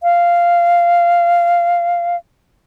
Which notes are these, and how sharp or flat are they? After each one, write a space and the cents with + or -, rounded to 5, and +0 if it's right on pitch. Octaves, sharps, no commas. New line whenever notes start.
F5 -10